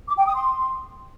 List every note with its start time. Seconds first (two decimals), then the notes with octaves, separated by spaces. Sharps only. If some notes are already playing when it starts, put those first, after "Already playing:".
0.08 D6
0.17 G5
0.27 D#6
0.36 C6